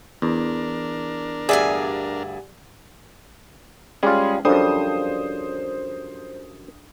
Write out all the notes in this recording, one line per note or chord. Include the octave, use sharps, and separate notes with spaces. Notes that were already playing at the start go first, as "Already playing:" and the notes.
E2 D4 A#4
D2 G2 G#4 D5 E5 G#5
G3 G#3 C#4 F4 G#4
F#2 F3 G3 D4 A4 C5 D#6